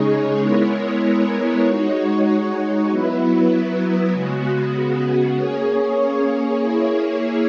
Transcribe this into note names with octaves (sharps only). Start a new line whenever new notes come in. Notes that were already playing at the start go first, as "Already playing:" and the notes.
Already playing: C#3 G#3 D#4 G#4 C#5
G#3 B3 E4 A#4 C#5
G#3 D#4 F#4 C#5
F#3 B3 E4 B4
C#3 G#3 B3 F#4
A#3 C#4 G#4 C#5
A#3 E4 G#4 C#5